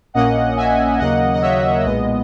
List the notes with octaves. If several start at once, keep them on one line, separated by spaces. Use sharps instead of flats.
A#1 A#2 A#3 C#4 D#5 F#5
E5 G#5
D#2 C#3 F#3 A#3 D#5 F#5
D#5
C#5 E5
B1 A#2 G#3 B3 D#5